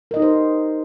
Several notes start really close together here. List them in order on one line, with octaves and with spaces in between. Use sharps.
A#4 D#5 D#4 G4 C5